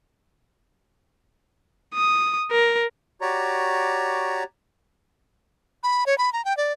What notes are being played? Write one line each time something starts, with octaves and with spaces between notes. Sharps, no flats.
D#6
A#4
F#4 G4 C#5 D5 A#5
B5
C#5
B5
A#5
G5
D5